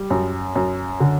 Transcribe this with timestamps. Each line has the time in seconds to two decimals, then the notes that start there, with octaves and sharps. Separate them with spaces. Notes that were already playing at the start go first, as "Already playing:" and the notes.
Already playing: G3
0.10 F#2
0.55 F#2
1.00 D3